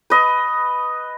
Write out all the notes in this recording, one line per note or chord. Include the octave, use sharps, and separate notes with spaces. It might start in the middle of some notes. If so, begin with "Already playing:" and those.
B4 D#5